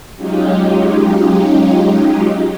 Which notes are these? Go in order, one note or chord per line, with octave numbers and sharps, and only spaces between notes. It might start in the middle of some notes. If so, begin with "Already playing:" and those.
F#3 G#3 C#4 D#4 F4 G4